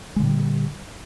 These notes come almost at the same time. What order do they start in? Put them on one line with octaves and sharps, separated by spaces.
G#3 D3 A#2 G3